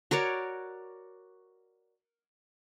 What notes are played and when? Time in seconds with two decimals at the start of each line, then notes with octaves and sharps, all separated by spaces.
0.11 F#4 A#4 C#5 D5